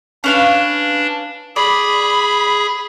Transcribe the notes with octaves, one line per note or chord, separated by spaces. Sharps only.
C#4 D4 B4 F5
G#4 D5 B5